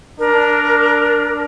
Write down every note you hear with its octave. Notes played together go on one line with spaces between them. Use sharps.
D4 A#4